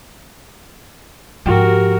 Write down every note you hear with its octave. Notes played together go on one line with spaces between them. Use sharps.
G#2 F3 F#4 G4 A#4